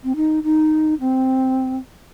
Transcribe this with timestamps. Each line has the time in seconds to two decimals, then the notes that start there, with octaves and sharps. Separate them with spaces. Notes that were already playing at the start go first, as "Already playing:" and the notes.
0.04 C4
0.16 D#4
0.44 D#4
1.00 C4